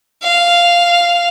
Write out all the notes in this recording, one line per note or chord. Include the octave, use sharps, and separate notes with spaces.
F5